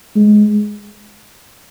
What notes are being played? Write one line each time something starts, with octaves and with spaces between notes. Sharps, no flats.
G#3